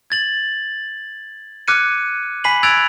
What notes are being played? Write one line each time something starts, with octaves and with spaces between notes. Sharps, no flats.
G#6 A6 F#7
D6 F6 F#6 G#6 C#7 D#7
G#5 B5 B6 C7 D#7 F#7
E6 F#6 G#6 A6 D7 F7